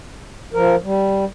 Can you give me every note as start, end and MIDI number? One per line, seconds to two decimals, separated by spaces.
0.54 0.76 53
0.54 0.76 70
0.84 1.25 55